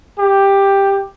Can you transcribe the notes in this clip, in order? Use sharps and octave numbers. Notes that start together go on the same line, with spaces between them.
G4